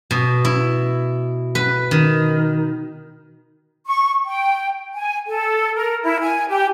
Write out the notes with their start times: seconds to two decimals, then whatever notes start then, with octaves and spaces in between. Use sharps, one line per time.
0.11 B2
0.45 E4
1.55 B4
1.91 D#3
3.86 C#6
4.24 G5
4.94 G#5
5.27 A4
5.75 A#4
6.03 E4
6.20 G#5
6.48 G4